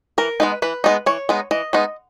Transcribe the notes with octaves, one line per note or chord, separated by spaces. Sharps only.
E3 A#4
G#3 B3 D#4 B4
E3 B4
G#3 B3 D#4
E3 C#5
G#3 B3 D#4
E3 D#5
G#3 B3 D#4